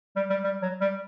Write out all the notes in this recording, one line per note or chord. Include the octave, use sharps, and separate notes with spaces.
G3
G3
G3
F#3
G3